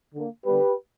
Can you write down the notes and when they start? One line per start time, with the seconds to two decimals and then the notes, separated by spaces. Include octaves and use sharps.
0.14 D3 A#3
0.45 D3 G3 B3 G4 B4